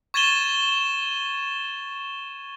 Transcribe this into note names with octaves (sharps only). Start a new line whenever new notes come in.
C#6 G#6 A6 D#7 E7 G7